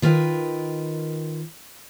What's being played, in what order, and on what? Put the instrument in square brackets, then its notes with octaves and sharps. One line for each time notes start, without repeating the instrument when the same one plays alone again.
[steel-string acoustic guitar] D#3 F4 A#4 B4 G5